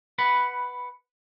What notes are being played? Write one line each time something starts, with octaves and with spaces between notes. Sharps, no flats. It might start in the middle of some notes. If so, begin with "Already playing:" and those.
B4 F#5 B5